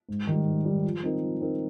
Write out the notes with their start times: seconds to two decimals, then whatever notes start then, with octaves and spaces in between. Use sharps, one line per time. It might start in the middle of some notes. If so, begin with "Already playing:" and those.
0.09 G#2
0.27 D#3 G3
0.46 G#2
0.65 D#3 G3
0.84 F3
1.03 C4 D#4 A#4
1.23 F3
1.41 C4 D#4 A#4